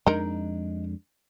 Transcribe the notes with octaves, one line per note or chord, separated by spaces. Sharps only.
F2 G#3 D4 D#4 A#4